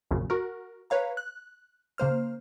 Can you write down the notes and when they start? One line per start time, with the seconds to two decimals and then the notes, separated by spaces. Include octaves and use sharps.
0.11 A#1 F#2 C#3
0.30 F#4 A#4
0.90 B4 C#5 F5 A#5
1.17 F#6
1.98 C#3 A#3 C5 F6